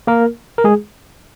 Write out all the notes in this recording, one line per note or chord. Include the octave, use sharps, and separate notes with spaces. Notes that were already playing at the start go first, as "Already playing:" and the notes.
A#3 A#4
A#4
G#3 G#4